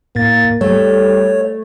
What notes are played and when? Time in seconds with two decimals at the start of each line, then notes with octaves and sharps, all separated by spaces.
0.16 A2 A#3 A6
0.61 G3 A3 C#5